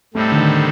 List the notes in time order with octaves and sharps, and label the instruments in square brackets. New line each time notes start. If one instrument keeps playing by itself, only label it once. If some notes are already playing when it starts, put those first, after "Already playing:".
[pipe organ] A2 G3 C4 D#4 A4 [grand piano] A3
[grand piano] D3
D#3